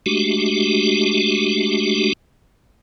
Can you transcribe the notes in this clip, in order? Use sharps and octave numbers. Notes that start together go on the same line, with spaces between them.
G#3 A3 D4 F#4 G4